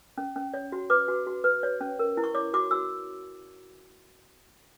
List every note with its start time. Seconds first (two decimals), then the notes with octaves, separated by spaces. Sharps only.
0.18 C#4
0.36 C#4
0.54 C#5
0.72 F#4
0.90 B4 D6
1.08 F#4
1.27 F#4
1.44 B4
1.63 C#5
1.81 C#4
1.99 A#4
2.17 E4
2.24 C#6
2.35 C#5 D6
2.54 F#4 D6
2.71 F#4 E6